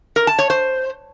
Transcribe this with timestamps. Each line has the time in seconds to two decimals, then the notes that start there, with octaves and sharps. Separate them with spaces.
0.16 A#4
0.27 A5
0.39 C#5
0.50 C5